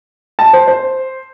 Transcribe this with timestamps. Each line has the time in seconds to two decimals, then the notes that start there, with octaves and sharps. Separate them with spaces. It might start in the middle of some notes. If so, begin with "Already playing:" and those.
0.39 A5
0.53 C5
0.68 C5